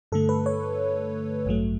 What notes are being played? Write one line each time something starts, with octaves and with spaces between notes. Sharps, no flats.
G2 D3 A3 A4
B4
C#5
A1 G2 F#3 A3